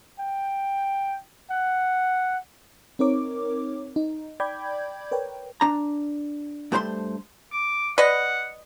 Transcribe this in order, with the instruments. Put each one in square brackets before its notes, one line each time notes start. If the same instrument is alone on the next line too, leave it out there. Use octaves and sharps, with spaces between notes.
[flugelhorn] G5
F#5
[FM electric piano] C4 D#4 A#4 C#5 D6
D#4
D5 G5 B5 D6 G6 G#6
A#4 B4 C#5 G5
[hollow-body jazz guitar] D4 A#5
G2 A3 C5 A#5 C6
[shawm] D6
[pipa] B4 D#5 [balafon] D5 [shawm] F#5